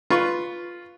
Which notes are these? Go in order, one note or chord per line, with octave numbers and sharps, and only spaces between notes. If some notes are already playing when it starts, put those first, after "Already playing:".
F4 B4 C#6